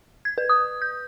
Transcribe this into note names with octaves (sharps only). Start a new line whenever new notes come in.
G#6
B4
D#6
G6